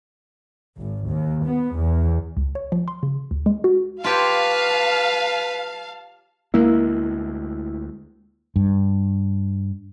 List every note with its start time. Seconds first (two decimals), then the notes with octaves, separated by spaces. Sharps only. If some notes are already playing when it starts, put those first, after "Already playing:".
0.78 G#1
1.08 D#2
1.46 B3
1.76 E2
2.37 C#2
2.55 C#5
2.72 F3
2.88 C6
3.03 C#3
3.31 D2
3.46 G#3
3.64 F#4
4.04 F4 G4 B4 C#5 F5 A5
6.54 D2 G#3 A#3 E4
8.56 G2